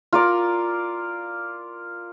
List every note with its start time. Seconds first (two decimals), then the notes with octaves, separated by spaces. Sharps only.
0.13 F4 A#4 D5